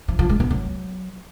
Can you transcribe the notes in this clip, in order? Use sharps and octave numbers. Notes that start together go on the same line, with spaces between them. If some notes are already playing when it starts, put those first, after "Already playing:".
F3
F3
G#3
B3
F#3